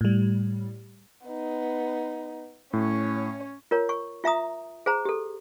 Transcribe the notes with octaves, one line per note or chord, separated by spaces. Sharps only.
A2 G3
B3 D#4
A2 C#4 C#5
F4 A#4 C#5
C#6
F4 E5 A#5 D#6
G#4 C5 A#5
G4 A4